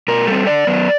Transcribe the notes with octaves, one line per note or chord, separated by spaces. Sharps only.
B2 A#4
G3 C4 A4
D3 D5
F#3 B3